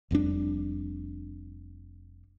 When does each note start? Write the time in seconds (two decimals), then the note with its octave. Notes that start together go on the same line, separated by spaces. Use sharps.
0.11 F1 F2 G3 D4